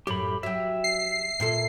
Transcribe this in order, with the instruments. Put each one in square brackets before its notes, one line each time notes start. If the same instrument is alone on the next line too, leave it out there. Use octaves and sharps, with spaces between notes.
[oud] F#2 A2 [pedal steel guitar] G4 B5
[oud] F#3 G4 [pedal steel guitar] E5
[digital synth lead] C7
[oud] A#2 E4 A4